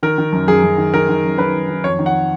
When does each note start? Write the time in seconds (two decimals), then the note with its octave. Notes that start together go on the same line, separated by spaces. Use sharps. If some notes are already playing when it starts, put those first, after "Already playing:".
0.03 D#3 A#4
0.18 D#3
0.33 F#2
0.48 F#2 G#4
0.63 F#2
0.78 D#3
0.94 D#3 A#4
1.09 D#3
1.24 F#2
1.38 D#3 B4
1.53 D#3
1.69 D#3
1.84 F2 C#5
1.99 D#3
2.06 F#5